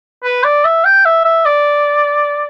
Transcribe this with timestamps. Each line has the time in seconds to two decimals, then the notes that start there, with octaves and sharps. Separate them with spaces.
0.24 B4
0.44 D5
0.65 E5
0.85 G5
1.05 E5
1.25 E5
1.45 D5